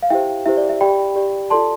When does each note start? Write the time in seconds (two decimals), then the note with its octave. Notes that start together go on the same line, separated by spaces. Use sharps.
0.03 F5
0.10 E4 G4 C5 E5 G5
0.46 E4 G4 C5 E5
0.57 D5
0.69 E5
0.81 G4 D5 G5 B5
1.16 G4 D5
1.50 F4 A4 D5 A5 C6